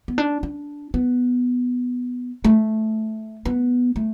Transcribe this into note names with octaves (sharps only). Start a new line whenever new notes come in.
B3
D4
D4
B3
A3
B3
A3